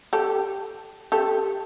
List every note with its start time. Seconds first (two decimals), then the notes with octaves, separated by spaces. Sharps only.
0.13 G4 A4
1.12 G4 A4